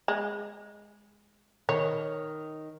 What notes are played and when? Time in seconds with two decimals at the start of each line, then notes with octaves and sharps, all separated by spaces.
0.08 G#3
1.69 D#3 C#5